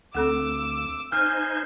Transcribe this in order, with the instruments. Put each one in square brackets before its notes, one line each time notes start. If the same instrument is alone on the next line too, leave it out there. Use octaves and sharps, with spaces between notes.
[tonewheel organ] D2 [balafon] C4 A4 F#5 [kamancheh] D6 E6
[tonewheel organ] D#4 C5 [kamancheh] G#5 [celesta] F6